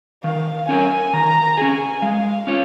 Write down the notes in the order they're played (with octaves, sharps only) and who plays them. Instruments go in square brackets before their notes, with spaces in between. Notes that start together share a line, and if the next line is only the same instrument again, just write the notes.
[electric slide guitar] D#3 [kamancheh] F5
[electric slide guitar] C#4 A#4 C#5 [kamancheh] G#5
[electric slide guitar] D#3 [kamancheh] A#5
[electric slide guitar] C#4 G#4 [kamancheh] G#5
[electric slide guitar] G#3 [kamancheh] F5
[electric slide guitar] C#4 F4 C#5